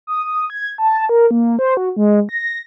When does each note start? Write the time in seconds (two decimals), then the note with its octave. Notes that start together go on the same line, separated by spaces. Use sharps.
0.07 D#6
0.24 D#6
0.50 G#6
0.78 A5
1.09 A#4
1.31 A#3
1.59 C5
1.77 F#4
1.97 G#3
2.29 A#6